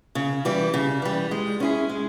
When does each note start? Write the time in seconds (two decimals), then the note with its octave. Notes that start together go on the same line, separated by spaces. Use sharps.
0.15 C#3
0.45 E3 G3
0.74 C#3
1.02 E3 G3
1.31 G#3
1.60 C#4 E4 G#4
1.89 G#3